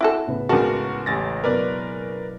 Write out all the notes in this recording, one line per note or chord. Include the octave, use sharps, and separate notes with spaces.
E4 F#4 A4
A2 C#3 B3
C#2 G#3 F#4 A#4 A5
A1 G4 G#5 A6 A#6
F#1 B2 A#4 B4 D5